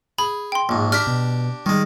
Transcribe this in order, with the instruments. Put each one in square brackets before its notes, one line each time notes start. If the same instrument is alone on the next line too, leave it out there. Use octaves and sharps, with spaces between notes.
[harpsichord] G#4 [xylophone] B5
[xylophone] G5 C6
[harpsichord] A#1 G#2
[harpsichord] D4 G4 A#5 [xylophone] F6 B6
[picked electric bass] B2
[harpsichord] D#3 G#3 [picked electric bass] G3